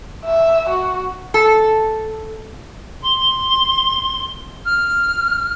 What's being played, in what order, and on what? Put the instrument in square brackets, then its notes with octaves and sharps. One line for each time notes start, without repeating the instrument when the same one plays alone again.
[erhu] E5
F#4
[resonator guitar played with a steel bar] A4
[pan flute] C6
F6